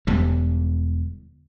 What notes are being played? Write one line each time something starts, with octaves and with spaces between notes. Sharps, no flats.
E1 E2 D3 G3